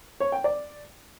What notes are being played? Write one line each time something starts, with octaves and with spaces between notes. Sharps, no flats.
C#5
G5
D5